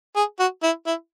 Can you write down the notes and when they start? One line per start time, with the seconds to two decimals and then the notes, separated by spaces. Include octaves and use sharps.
0.16 G#4
0.39 F#4
0.63 E4
0.86 E4